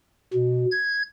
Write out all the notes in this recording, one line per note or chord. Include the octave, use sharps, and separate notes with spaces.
B2
G#6